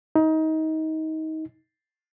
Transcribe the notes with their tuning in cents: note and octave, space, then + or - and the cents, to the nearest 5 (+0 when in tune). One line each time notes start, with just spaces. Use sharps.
D#4 +25